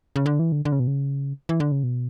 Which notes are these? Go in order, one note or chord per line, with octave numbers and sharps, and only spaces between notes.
C#3
D3
E3
D3
D3
C#3
B2
C#3
E3
D3
C#3
B2